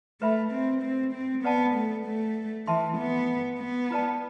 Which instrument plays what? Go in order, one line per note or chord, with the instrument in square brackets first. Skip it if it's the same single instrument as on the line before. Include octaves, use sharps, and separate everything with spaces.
[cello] A3 [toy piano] B4 E5 B5
[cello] C4
C4
C4
[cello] B3 [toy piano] B4 D5 F#5 A5
[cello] A3
A3
[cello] E3 [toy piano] B4 E5 A5 C6
[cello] B3
B3
[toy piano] E4 B4 D5 A5